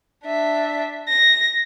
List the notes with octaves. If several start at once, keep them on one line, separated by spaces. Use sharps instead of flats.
D4 E5
A#6